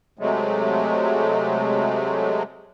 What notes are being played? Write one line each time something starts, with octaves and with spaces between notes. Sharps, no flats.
C3 F#3 G#3 A3